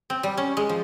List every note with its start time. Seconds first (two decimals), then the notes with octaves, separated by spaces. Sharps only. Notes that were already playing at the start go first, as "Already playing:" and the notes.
0.10 C4
0.23 G3
0.37 C#4
0.57 G#3
0.69 F3